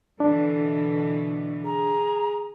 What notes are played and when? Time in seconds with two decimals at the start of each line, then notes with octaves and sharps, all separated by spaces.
0.20 B2 D3 E3 D4 A4
1.65 G#4 A#5